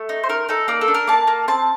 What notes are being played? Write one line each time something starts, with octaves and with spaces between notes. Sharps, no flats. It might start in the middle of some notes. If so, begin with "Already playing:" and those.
Already playing: A3
D#4
C5
D#4 A#4
D#4 A4
A#3 D5
A4
D4
A#4
A#3 A5
A#3
C4 A5